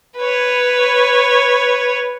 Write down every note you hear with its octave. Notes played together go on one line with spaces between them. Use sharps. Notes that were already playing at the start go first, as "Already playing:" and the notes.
B4 C#5